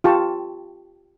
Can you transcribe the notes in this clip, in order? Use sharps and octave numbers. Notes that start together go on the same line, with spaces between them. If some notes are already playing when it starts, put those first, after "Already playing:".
F4 G4 A5 C#6